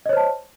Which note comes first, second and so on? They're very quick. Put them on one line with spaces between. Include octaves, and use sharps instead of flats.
D#5 C#5 C5 A5